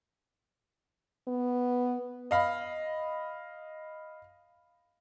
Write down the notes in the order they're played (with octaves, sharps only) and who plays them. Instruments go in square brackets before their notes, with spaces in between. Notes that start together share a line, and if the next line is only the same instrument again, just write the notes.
[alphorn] B3
[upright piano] D#5 F5 B5